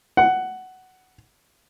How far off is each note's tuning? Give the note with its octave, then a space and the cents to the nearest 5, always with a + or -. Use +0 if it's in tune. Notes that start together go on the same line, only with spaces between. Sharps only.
F#5 +10